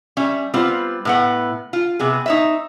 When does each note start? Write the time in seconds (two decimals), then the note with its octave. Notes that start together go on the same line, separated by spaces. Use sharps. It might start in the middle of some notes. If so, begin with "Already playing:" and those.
0.17 G3 C#4 E5
0.54 G3 B3 C4 F4
1.05 A2 B3 F#5
1.73 F4
1.99 C3 B3 G#4
2.26 D#4 C#5 E5